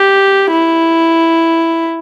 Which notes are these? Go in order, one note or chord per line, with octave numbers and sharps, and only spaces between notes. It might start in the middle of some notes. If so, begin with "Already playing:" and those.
Already playing: G4
E4